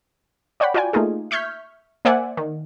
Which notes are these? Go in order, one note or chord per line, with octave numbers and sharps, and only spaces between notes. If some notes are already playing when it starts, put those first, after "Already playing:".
C#5 D5 F#5 G5 B5
F4 F#4 D5 G5 G#5
A3 A#3 D#4 F4 G#4
E5 C#6 F6 G6 G#6 B6
A#3 C5 D5 E5 F#5 G#5
D#3